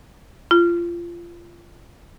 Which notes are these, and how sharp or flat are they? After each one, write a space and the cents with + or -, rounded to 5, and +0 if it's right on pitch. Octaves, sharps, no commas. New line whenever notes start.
F4 -25